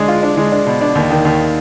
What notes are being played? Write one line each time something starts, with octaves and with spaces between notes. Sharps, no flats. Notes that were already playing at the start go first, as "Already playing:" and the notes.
Already playing: G#3 D4
F4
D4
G#3
D4
B2
D4
D#2
D#3
D#2